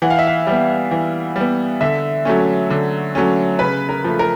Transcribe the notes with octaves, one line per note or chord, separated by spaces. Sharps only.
E3 F#5
F5
E5
F5
G3 B3
E3
G3 B3
D3 E5
F#3 A3 C#4
D3
F#3 A3 C#4
C#3 B4
A#4
F3 A3
A#4